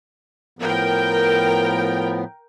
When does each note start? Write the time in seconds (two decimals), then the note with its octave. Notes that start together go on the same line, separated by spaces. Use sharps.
0.59 A2 F3 B3 A#4 G5